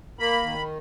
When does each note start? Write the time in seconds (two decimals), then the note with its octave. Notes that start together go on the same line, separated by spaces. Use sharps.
0.19 A#3 B5
0.43 D#3